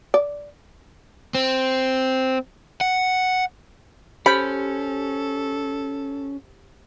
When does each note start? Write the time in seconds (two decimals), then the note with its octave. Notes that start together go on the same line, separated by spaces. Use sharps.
0.14 D5
1.35 C4
2.81 F#5
4.26 C#4 G4 A4 C5 B5 G6